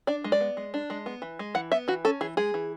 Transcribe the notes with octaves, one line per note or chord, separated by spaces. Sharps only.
D4 D5
G#3
D5
B3
G#3
D4
G#3
B3
E3
G#3
E3 F#5
B3 E5
E3 F#4
C#4 A4
E3 G#4
G#3 G#4
E3